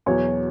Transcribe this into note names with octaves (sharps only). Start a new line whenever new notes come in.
E2 B2 F#3 C#5